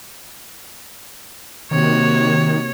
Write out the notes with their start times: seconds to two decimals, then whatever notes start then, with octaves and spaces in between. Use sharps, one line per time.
1.71 C3 D#3 A#3 F#4 C#5